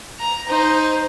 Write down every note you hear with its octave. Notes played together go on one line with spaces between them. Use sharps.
A#5
D#4 C5